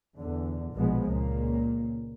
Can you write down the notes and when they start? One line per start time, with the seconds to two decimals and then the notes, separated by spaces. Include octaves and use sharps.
0.18 E2 D3
0.73 A#1 B2 F3 G#3 B3
1.09 C#2 A#2 A#3